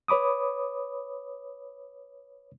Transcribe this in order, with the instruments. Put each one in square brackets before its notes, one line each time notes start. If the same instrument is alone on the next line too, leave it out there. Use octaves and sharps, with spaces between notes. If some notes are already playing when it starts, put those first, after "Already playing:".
[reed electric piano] B4 C#5 B5 D6 D#6